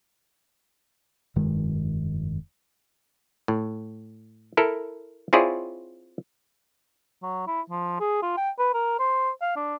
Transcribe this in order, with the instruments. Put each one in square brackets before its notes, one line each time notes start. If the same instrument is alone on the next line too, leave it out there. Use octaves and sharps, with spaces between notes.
[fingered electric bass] F1 G2 D#3 G#3
[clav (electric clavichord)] A2
E4 A4 A#4
C4 E4 F4 G#4 C#5 D5
[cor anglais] F#3
E4
F3
G#4
F4
G5
B4
A#4
C5
F5
D4